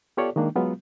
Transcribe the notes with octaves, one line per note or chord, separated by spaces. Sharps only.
B3 F4 G4 A4 C#5 D5
D#3 G#3 A#3 D4
F#3 G#3 B3 F4